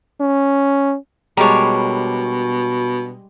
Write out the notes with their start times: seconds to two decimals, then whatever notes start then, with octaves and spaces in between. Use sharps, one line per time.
0.21 C#4
1.37 B2 G3 G#3 D4 A#4 C#5